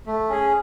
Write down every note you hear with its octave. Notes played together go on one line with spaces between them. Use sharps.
A3
C#4 G#4